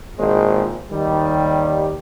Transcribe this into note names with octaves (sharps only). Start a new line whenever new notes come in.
G#1 A#2 G#3 C5
D#2 D#3 G3